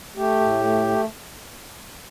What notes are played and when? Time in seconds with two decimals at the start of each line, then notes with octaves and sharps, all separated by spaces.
0.16 A3 G4
0.40 A2
0.64 A3
0.87 A3